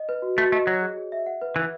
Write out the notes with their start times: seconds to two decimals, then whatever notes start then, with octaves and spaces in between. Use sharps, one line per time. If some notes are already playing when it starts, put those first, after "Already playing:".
Already playing: D#5
0.09 B4
0.22 F#4
0.38 A3 F#4
0.52 A3 D#5
0.67 F#3 C#5
0.81 G#4
0.97 G#4
1.12 E5
1.26 F#5
1.41 B4
1.56 E3 B4